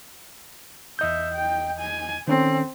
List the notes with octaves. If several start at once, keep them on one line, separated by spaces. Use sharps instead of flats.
E2 D#5 E5 G6
G5
G#5
D#3 C4 C#4 A4